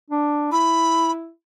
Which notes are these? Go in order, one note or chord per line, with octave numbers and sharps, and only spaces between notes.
D4
E4 B5